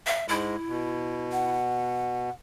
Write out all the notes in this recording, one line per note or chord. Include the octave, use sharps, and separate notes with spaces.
E5
G#2 G#3 E4
B2
F#5